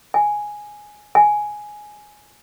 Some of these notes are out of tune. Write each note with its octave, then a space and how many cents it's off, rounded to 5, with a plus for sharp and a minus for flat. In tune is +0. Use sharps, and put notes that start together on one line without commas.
G#5 +0
G#5 +5